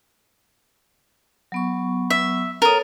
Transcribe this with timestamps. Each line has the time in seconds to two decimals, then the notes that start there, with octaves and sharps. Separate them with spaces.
1.52 F#3 B3 C#6
2.10 E5
2.62 A4 A#4 C#5 D#6